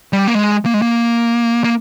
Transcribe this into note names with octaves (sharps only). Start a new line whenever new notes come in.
G3
A#3
G#3
A#3
G#3
A#3
A#3